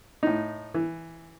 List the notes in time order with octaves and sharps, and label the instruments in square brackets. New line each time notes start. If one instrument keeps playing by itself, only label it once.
[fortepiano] A2 D#4
E3